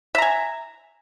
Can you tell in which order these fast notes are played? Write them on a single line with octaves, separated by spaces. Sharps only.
E5 A#5 G#5